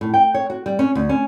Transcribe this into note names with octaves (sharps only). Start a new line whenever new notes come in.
A2
G5
C#5
F#4
G3
C#4
D2
C#4